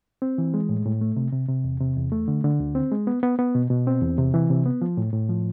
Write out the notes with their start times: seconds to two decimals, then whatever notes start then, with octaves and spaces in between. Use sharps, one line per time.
0.22 C4
0.38 E3
0.54 G#3
0.69 A2
0.86 A2
1.01 A3
1.16 C3
1.32 C3
1.49 C3
1.64 E2
1.80 C3
1.96 E2
2.12 A3
2.28 D3
2.44 D3
2.60 D2
2.75 C4
2.92 G#3
3.07 B3
3.23 B3
3.39 B3
3.55 B2
3.70 B2
3.87 C4
4.02 E2
4.18 C3
4.34 E3
4.50 C3
4.65 B3
4.82 F3
4.97 A2
5.13 A2
5.29 F3